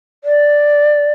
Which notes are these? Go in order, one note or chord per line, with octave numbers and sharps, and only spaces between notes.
D5